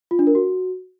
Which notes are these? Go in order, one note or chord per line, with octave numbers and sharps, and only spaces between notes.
F4
D4
A#4
F#4